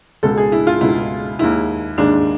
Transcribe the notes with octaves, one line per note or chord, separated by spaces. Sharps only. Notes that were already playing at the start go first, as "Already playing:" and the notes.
C#2 B2 G#3 A4
G#4
E4
F4
C#2 B2 G#3 E4
D#2 D#3 G#3 E4
D#2 D#3 G#3 D4